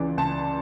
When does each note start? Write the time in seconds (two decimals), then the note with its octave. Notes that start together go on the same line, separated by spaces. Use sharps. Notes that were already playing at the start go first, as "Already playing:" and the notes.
Already playing: C#2 C#3 E3 D5
0.17 C#2 A5